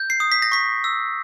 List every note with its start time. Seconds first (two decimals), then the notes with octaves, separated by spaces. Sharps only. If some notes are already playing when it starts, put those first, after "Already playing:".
Already playing: G6
0.10 C7
0.20 D#6
0.32 B6
0.42 A#6
0.52 C#6 B6
0.84 E6